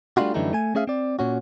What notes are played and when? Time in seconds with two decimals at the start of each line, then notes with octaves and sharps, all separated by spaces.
0.17 G3 A3 D4 D#4 F4 F#4
0.34 F#2 D3 E3 G3 A3 D#4
0.53 A3 G#5
0.75 A3 C#4 G#4 E5 F5
0.87 C4 D5
1.19 A#2 C#4 F#4